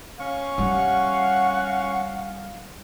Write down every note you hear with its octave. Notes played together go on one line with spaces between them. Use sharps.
C#4 F5 C#6
G3 F#5